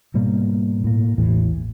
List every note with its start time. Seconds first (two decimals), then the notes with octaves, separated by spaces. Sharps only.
0.14 G#2 B2 G3 A#3
0.84 A2 A#3
1.18 A1 E2 A2 E3